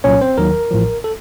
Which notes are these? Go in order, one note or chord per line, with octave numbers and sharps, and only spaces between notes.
C2 A#2 F#3 C#4 C#5
C4 C5
D#2 D#3 F#3 A#4
A1 A2 F3
A4